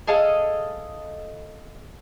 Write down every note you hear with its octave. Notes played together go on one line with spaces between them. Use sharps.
G#4 A4 D#5 F5